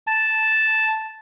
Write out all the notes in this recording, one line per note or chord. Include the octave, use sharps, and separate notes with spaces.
A5